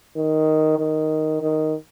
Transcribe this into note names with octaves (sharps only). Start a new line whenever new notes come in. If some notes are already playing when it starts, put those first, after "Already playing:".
D#3
D#3
D#3